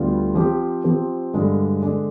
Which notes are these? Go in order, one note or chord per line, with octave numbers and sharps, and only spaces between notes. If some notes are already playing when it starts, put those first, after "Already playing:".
Already playing: D2 D3 G3 B3 F4
F3 C4 G4
F3 C4 G4
G2 D3 G#3 D4
D3 G#3 D4